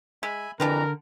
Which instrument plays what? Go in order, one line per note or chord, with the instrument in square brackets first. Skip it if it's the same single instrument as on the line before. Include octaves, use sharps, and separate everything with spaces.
[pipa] G#3 [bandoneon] E5 G#5 B5
[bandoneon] F2 E3 A#5 [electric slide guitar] D3 [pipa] D4 G4 B4 [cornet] A#4